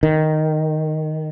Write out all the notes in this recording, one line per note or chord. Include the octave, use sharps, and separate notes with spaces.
D#3